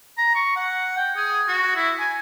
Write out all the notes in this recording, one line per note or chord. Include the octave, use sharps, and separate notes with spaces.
A#5
C#6
F#5
G5
G#4
F#4
E4
G#5